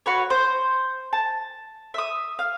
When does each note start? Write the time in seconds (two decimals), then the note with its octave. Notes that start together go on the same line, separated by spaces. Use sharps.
0.06 F#4 B4 C#5
0.30 C5
1.13 A5
1.94 E5 D#6
2.39 F5